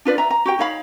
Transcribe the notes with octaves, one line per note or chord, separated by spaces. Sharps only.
D4 F4 B4 D5
E5 A#5
A#5
F#4 G4 G5
D#4 C#5 F5 B5